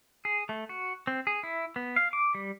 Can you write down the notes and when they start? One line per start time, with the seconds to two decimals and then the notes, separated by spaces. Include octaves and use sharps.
0.25 G#4
0.49 A3
0.69 F#4
1.07 C4
1.27 G#4
1.43 E4
1.76 B3
1.96 F5
2.13 D6
2.35 G3